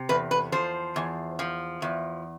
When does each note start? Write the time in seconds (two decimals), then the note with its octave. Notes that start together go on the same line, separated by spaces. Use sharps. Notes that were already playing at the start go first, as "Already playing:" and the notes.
Already playing: C3
0.09 E2 B4
0.31 B4
0.52 F3 C5
0.96 E2
1.39 F3
1.82 E2